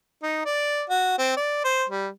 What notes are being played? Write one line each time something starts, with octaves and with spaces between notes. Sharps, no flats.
D#4
D5
F#4
C4
D5
C5
G3